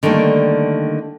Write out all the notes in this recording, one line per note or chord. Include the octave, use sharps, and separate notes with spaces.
D3 D#3 G3 A3 A#3